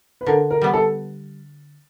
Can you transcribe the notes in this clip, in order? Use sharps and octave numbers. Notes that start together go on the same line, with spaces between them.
B4
D3 A#4
A#4
G3 B3
A4